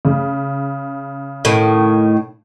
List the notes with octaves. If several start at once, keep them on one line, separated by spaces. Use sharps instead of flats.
C#3
A2 D#3